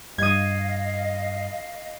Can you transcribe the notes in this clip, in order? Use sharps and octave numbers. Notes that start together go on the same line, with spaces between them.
G2 D#5 F5 D#6 G#6